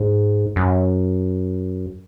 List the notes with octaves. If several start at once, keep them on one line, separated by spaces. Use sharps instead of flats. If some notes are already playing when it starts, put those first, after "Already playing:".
Already playing: G#2
F#2